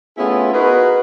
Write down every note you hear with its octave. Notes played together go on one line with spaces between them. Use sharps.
A3 B3 C#4 E4 F4 G#4
D#4 F#4 G#4 A#4 B4